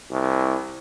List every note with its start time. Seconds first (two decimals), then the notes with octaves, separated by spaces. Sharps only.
0.11 C2